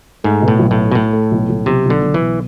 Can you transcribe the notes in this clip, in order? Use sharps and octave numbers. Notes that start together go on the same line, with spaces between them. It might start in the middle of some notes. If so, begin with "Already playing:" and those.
G#2 A3
B2
A2
B1
A2
A3
B2
A2 A3
A3
B1
B1
B1 C3
B1
D3
B1
E3
B2